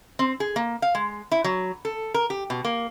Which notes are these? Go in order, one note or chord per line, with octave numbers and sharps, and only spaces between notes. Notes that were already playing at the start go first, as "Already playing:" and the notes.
C4
G#4
A#3
F5
G#3
E4
F#3
A4
A#4
G4
B2
A#3